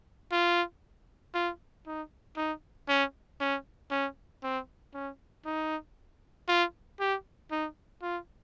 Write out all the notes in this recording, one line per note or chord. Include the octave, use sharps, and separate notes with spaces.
F4
F4
D#4
D#4
C#4
C#4
C#4
C4
C#4
D#4
F4
G4
D#4
F4